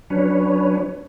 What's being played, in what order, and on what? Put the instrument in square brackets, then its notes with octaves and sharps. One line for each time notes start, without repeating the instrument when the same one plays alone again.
[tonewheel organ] F#3 C#4 D4 B4 C#5